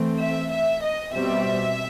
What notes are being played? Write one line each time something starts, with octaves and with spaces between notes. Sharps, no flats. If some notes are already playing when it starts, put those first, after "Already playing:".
Already playing: E3 A3 C4
E5
E5
D#5
B2 G3 C4 E5